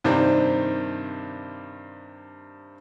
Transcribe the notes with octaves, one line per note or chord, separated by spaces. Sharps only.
G2 C3 D#3 C4 D4